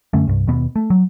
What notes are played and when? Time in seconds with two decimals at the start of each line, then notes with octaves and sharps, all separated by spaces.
0.13 F#2 D3 A3 C#4
0.27 C2 G2
0.47 D#2 B2 B3
0.76 A3
0.90 F#3